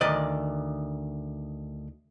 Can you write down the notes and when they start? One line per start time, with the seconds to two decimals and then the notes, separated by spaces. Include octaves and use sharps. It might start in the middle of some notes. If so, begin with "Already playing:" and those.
0.01 D2 D#3 D5 D#5